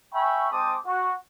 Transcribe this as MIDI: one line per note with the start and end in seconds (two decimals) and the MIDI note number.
0.14 0.47 76
0.14 0.47 79
0.14 0.47 80
0.14 0.47 83
0.14 0.47 85
0.51 0.75 56
0.51 0.75 60
0.51 0.75 72
0.51 0.75 81
0.51 0.75 86
0.51 0.75 87
0.86 1.13 66